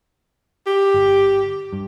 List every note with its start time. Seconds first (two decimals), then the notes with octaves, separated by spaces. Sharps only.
0.67 G4
0.94 G1
1.73 G2